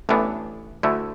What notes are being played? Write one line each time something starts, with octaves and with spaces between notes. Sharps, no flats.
A1 A2 E3 B3 D4
D2 D3 A3 E4